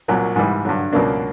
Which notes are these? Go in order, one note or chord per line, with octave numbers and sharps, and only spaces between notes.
C2 A#2 F#3 A#3
G#2 E3 G3
G2 D3 F#3
C#2 B2 F#3 A#3 D4